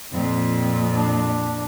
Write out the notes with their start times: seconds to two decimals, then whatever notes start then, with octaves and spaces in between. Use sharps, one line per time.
0.12 F2 A#2 C4
0.94 D4